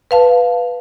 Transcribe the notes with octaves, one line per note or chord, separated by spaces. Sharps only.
B4 F5 A5